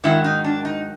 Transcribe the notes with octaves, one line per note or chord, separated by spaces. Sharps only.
G#2 D#3 F#3 A#3 E4
D#4
D4
D#4